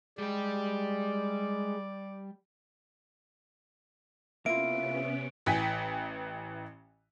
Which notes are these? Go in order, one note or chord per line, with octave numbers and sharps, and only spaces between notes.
G3 G#3 D5 G5
C3 A#3 B3 C#4 E4 F4 E5 D7
A1 E3 G5 G#5 B6